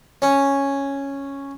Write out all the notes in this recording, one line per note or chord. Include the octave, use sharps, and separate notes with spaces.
C#4